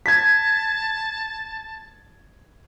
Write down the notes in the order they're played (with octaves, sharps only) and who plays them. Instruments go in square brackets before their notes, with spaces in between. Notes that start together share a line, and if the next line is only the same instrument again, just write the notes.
[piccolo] A5 [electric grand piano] G#6 B6